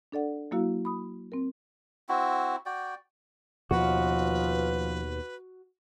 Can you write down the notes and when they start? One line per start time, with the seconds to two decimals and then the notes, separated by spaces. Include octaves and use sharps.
0.12 D4 A4 D5 F#5
0.51 F#3 A#3 E4 F#4 F5
0.85 B5 D#6
1.32 C4 A#4
2.09 C4 E4 F#4
2.66 F#4 D5 G5
3.71 D#2 B2 F3 F#4 B4